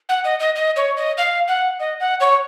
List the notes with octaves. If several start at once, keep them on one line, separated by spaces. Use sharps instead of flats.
F#5
D#5
D#5
D#5
C#5
D#5
F5
F#5
D#5
F#5
C#5